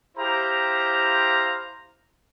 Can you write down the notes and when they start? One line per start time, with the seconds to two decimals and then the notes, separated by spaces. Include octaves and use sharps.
0.17 E4 G4 C5 F5 A#5